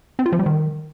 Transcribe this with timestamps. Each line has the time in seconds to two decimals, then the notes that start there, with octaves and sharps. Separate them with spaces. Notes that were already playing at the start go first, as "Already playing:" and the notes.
0.19 C4
0.26 F4
0.32 F3
0.39 G3
0.46 D#3